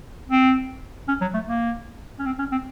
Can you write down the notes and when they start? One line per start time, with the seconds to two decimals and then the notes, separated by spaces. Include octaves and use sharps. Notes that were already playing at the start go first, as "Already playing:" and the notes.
0.29 C4
1.08 C#4
1.21 F#3
1.34 A3
1.47 A#3
2.19 C#4
2.26 C4
2.39 C#4
2.52 C4